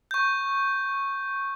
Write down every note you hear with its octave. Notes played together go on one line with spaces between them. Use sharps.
C#6 G6